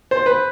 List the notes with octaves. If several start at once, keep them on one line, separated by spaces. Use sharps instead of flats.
C5
B4